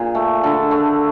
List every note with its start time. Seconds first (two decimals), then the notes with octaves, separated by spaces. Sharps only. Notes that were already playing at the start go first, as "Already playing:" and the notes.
Already playing: A#2 G#4
0.15 A3
0.43 D3 A4
0.71 A3